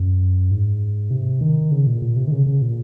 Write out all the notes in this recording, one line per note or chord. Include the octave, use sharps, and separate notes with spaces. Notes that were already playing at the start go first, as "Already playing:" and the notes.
Already playing: F#2
G#2
C3
D#3
C#3
A#2
A#2
C3
D#3
C#3
C#3
A#2